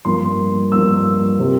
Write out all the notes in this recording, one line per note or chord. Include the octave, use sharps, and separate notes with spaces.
G2 F3 A#3 C6
G2 F3 A#3 E6
C3 G3